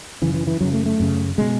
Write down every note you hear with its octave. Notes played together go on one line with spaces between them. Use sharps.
F#2 C#3 E3
E3
E3
F#2 C#3 F#3
A3
A3
F#2 C#3
B2 G#3